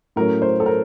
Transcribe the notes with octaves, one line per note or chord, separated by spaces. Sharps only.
A2 F#3 A3 C#4 A#4
C5
A4
A#4